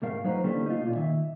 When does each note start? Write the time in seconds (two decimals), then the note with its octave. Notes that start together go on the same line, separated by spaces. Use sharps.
0.02 C2 G#2 A3 A#4 F5
0.24 F2 F#3 D#4 B4 C5 A#5
0.44 D3 E3 A3 A#3 C#4 G4
0.66 D#4 F4
0.81 B1 A#2
0.96 D#3 E5